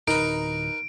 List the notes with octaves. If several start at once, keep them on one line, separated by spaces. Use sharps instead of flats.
D1 D#4 A#4 B4 D7